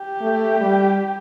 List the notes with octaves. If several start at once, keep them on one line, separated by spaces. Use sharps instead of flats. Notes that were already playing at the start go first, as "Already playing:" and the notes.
Already playing: G4
A3
G3